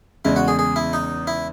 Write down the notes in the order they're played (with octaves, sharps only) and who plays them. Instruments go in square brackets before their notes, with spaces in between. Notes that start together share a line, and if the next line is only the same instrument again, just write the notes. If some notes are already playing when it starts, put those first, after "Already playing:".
[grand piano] E2 C#3 G#3 [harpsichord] E4
[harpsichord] F#4
G#4
G#4
E4
D#4
E4